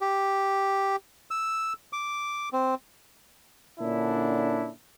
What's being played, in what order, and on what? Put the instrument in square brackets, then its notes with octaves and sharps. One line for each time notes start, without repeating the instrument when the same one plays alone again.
[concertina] G4
E6
D6
C4
[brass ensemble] A#2 D3 C#4 D4 E4